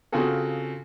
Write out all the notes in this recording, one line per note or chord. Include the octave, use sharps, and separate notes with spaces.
C#3 C4 F4 F#4 G#4 A4